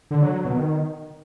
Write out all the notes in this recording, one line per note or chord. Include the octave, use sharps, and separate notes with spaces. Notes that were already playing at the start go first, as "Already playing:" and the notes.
D3
F#3
F#3
B2
D#3